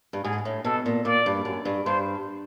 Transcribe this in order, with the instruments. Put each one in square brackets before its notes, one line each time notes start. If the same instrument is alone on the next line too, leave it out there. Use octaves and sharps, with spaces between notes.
[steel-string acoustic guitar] G2
[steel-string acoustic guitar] G#2 [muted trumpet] G#4
[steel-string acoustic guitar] A2
[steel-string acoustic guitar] B2 [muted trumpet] A4
[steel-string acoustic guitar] A#2
[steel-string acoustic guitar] A#2 [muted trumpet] D5
[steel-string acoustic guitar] G2
F#2
G2
[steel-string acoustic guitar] G2 [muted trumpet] C5